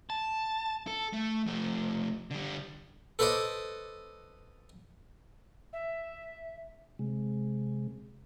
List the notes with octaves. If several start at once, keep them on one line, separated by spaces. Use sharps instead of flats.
A5
A4
A3
F3 A3
D3 G3
A4 B4 C5 D5 D#5
E5
C3 G#3